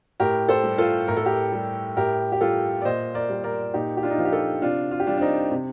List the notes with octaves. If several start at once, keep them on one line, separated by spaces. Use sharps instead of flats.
A2 G4 A#4
A4 C5
G3
F4 A4
A2 A#4
A4
G4 A#4
G3
A2 G4 A#4
G4
G3 F4 A4
D5
A#2 C5 D#5
A#4 D5
G3
A#4 D5
A#2 D#4 G4
G4
D4 F4
D#4
F3 F4
G4
F4 A4
C3 D4 F4
F4
G4
G3 D4 F4
D4
C4 D#4
C3